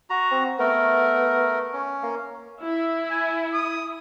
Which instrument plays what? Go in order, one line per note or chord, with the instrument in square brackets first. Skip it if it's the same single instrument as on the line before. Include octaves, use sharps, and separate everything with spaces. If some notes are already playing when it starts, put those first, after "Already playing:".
[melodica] F#4 A#5
[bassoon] C4
[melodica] A3 A#4 [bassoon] B3
[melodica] C#4
[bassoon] A#3
[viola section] E4
[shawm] G#5
D#6